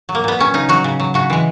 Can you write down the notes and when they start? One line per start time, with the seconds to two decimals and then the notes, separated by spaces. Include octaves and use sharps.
0.09 F#3
0.15 A#3
0.24 A#2 B3
0.39 F#3 C#4
0.54 C#3 D#4
0.69 F#3 F#4
0.84 C#3
1.00 F#3
1.14 C#3 F#4
1.30 E3 G#3